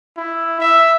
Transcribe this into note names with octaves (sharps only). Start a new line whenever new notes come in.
E4
E5